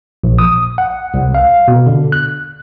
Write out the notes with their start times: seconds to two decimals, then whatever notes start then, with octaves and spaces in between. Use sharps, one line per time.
0.24 A#1
0.39 D#6
0.78 F#5
1.14 C2
1.35 F5
1.68 B2
1.86 D3
2.12 F#6